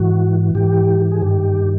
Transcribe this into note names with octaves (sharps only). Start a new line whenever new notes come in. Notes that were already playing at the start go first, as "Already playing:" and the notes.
Already playing: G#2 E3 F#4
G#2 E3 G4
G#4
G2 D#3 G4